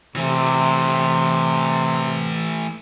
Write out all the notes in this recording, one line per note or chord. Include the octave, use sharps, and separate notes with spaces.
C3 E3 A3